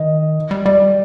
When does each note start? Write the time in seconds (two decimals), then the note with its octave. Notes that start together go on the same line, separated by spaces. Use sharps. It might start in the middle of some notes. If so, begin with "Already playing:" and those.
Already playing: D#3 D#5
0.51 G3
0.65 G3 D5